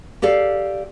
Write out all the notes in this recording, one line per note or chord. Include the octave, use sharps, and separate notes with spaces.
G4 A4 D5 F5